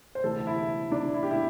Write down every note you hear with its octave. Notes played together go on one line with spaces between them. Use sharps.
C5
D2 C3 E3 A4
E4
D4
E4
G4
E4